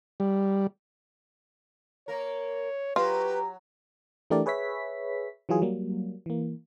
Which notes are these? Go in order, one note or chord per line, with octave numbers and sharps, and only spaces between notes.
G3
A#3 A#4 C#5
F#3 F4 G4 B4
E3 A3 D4 G4 A#4 D5
G#4 B4 C#5 E5 B6
E3 F#3 F4 G#4
F#3 G3 A#3
E3 A#3